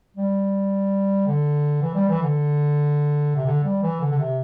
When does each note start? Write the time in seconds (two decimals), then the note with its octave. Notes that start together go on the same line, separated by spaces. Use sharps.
0.17 G3
1.27 D3
1.82 E3
1.95 G3
2.09 E3
2.23 D3
3.36 C3
3.46 D3
3.64 G3
3.83 E3
4.01 D3
4.11 D3
4.19 C3